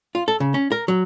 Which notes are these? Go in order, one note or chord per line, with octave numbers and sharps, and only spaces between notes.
F4
A4
C#3
C#4
A#4
F#3